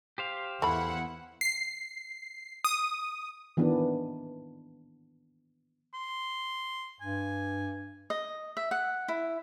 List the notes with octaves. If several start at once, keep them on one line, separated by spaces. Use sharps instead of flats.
G4 C5 F5
E2 A3 E4 F#5 B5
C7
D#6
D#3 E3 B3 D4
C6
G2 G#5
D#5
E5
F#5
E4